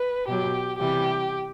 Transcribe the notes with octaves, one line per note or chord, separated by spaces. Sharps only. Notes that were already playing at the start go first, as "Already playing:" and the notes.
Already playing: B4
B2 F#3 G4
C3 E3 G3 G4